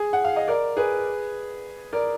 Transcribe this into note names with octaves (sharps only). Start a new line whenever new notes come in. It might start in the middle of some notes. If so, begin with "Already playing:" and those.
Already playing: G#4
F#5
F5
D#5
A#4 D5
G#4 B4
A#4 D5